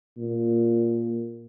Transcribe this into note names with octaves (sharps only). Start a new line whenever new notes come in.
A#2